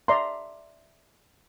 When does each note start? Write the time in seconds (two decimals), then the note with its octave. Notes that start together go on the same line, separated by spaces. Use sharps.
0.08 D5 E5 A#5 C6